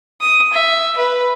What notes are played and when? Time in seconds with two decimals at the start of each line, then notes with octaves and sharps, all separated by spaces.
0.21 D#6
0.53 E5
0.97 B4